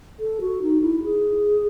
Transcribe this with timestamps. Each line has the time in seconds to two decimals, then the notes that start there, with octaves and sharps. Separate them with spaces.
0.19 A4
0.41 F#4
0.62 D#4
0.82 E4
1.04 G#4